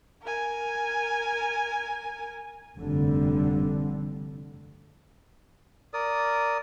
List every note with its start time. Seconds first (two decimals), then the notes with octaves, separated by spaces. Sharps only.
0.22 A#4 G#5
2.77 F1 G2 D3 G3
5.93 A#4 D5 D#6